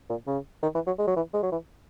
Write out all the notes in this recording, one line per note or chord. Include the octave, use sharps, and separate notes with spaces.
A#2
C#3
D#3
E3
F#3
G#3
F#3
E3
G#3
F#3
E3